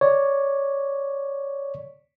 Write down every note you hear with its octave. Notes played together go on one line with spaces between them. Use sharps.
C#5 D5